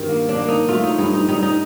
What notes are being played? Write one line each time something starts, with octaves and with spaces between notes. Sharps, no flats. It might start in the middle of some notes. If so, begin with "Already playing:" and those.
Already playing: G2 D#3
A#3
D4
A#3
D#4
A3 F4
D#4
G2 D#4
D#4
G3 D#4
D#4